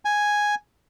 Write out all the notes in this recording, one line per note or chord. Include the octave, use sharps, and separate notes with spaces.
G#5